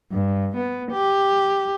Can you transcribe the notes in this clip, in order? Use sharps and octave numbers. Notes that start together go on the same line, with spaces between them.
G2
B3
G4